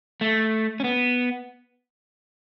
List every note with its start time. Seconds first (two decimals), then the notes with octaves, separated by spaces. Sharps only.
0.21 A3
0.80 C#4
0.84 B3